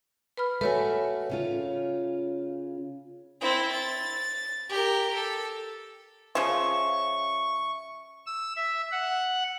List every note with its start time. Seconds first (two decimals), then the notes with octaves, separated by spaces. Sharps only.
0.37 B4 B5 F6
0.61 A3 F#4 B4 C#5 G#5
1.30 C#3 C#4 F4
3.41 C4 E4
3.72 A6
4.69 G4 A#4
5.14 A4
6.35 C#3 F3 E5 C#6
8.26 E6
8.56 E5
8.92 F#5